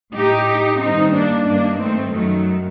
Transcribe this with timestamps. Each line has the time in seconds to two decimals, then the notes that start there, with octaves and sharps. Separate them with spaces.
0.15 A2 D#4 G4
0.81 G2 D#3 C4 D#4
1.14 A#3 D4
1.47 G2 D#3 A#3 D4
1.80 A3 C4
2.13 F#2 D#3 F#3 A3